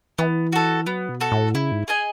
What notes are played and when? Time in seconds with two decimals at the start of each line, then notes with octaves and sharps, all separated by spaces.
0.19 E3 B3
0.53 F#4 A4
0.87 F#3 B3
1.09 B2
1.21 F#4 A4
1.32 A2
1.54 C#3 E4
1.72 G#2
1.88 G#4 D#5 G#5